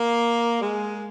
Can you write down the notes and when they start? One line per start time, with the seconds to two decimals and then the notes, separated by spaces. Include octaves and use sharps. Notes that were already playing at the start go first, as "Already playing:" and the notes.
Already playing: A#3
0.61 G#3